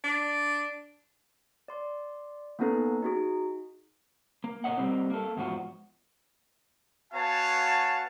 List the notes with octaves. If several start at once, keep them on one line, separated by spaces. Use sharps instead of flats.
D4
D5 C6
A#3 B3 C#4 D#4 A4 B4
D#4 F#4 G#4
A#3
B2 A#4 C#5 D#5 F#5
G3 A#3 C4 D#4
A#3 A4
E2 G#2 F3 F#4
B3 F#4 C#5 F5 G#5 A5